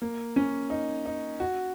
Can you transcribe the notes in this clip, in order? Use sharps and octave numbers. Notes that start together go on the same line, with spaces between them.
A#3
C#4
D#4
D#4
F#4